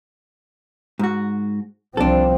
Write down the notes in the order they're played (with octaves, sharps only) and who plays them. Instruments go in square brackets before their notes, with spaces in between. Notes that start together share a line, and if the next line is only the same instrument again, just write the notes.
[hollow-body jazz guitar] G#2 F#4
[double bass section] C2 F3 C4 [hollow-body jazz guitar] D4 A4